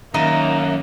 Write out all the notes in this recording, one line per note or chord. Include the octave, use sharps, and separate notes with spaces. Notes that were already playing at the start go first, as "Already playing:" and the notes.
F#2 D#3 A#3 D#4 D#5 E5 A#5